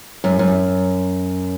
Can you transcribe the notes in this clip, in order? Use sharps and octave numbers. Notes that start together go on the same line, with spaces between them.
F#2
F#2